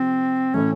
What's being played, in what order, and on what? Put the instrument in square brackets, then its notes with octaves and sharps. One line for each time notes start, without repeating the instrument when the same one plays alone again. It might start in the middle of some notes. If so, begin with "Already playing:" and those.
Already playing: [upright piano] C3 F3 [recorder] C4
[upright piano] A2 E3 A3 [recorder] C#4